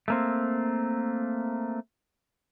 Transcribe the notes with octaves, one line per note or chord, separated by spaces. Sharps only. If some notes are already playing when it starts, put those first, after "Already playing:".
A3 A#3 C4